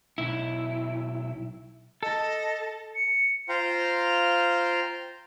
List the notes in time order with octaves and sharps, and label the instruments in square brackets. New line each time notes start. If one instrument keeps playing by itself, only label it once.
[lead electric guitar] B1 E4
[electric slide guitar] A4 [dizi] D#5
[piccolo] C#7
[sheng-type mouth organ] F4 C5 F5 G5 A#5 C6